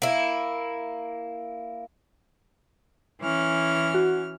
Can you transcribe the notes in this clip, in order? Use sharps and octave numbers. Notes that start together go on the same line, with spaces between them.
A#3 E4
E3 C#4 F6
F#4